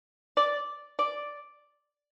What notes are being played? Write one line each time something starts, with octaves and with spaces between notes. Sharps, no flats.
D5
D5